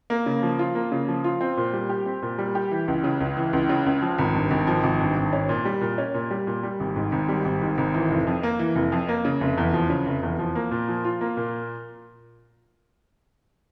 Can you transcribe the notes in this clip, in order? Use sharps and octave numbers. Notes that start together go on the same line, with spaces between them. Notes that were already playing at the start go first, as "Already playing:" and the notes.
A#3
C#3
F3
F4
A#3
C#3
F3
F4
C4
A#2
G3
G4
C4
A#2
G3
G4
E3
C#2
C#3
C#2
E3
C#2
C#3
C#2
F3
G#1
G2
G#1
F3
G#1
G2
G#1
C#4
A#2
G3
A#2
C#4
A#2
G3
A#2
G3
G#1
G#2
G#1
G3
G#1
G#2
G#1
E3
F1
F2
A#3
E3
F1
F2
A#3
C#3
F1
E2
F3
C#3
F1
E2
F3
A#3
A#2
F3
F4
A#3
A#2